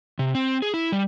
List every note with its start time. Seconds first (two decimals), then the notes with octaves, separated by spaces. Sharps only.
0.19 C3
0.35 C4
0.62 G#4
0.74 E4
0.92 G3